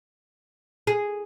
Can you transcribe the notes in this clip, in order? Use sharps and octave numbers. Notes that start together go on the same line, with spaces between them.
G#4